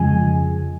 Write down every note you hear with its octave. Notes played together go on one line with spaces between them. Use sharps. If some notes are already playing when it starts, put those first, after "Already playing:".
Already playing: F2 C#3 F3 G#3 G#5